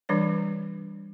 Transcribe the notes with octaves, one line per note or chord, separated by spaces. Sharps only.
E3 G3 D4 C#5